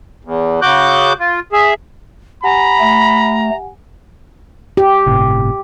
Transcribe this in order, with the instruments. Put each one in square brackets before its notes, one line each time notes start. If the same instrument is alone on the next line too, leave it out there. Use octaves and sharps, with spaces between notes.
[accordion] E2
C#3 F#4 D6 F#6 G6
F4
G#4 E5
[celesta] G4 F#5 G#5 [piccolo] A#5 [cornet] B5
[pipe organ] A3
[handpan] G4
[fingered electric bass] G1 A2 C3